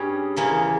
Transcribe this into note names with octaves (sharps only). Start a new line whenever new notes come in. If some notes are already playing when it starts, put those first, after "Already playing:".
Already playing: G2 G3 C#4 G#4
E2 C#3 E3 A#3